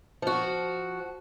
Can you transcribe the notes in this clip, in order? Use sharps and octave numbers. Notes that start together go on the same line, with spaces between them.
F3 F#4